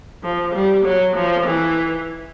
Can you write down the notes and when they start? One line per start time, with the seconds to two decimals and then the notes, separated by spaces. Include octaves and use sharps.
0.23 F3
0.54 G3
0.84 F#3
1.15 F3
1.45 E3